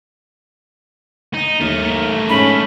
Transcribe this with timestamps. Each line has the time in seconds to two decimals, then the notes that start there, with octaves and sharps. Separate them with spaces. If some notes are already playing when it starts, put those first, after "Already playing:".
1.34 D#4
1.60 D#2 A3 A#4
2.29 G#2 C#4 B5